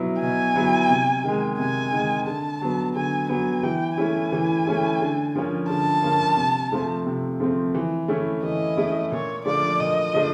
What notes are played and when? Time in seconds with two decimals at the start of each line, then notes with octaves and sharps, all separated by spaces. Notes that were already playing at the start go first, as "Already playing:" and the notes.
Already playing: B2 F#3 B3 E4
0.21 B2 G#5
0.55 F#3 B3 E4
0.90 C3
1.24 D#3 G#3
1.58 C3 G#5
1.92 D#3 G#3
2.27 D3 A5
2.62 F#3 B3
2.95 D3 G#5
3.29 F#3 B3 G#5
3.63 E3 G5
3.98 A3 C#4 E4 G#5
4.32 E3
4.66 A3 C#4 E4
5.01 D3
5.35 F3 A#3 C#4
5.69 D3 A5
6.03 F3 A#3 C#4
6.37 C3
6.72 F3 A3 C4
7.06 C3
7.40 F3 A3 C4
7.74 E3
8.08 A3 C#4 E4
8.43 E3 D#5
8.77 A3 C#4 E4
9.12 A#2 C#5
9.46 F3 A3 D4 D5
9.80 A#2 D#5
10.14 F3 A3 D4